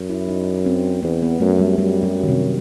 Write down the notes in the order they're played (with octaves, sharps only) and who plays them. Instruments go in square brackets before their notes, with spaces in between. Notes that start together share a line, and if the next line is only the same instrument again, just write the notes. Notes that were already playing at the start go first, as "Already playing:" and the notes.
Already playing: [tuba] F#2
[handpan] E4
D#4
C4
[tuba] E2 [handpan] B3
[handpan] B3
[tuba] F#2 [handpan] A3
[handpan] G3
[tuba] F#2 [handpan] G3
[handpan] F#3
D#3
C3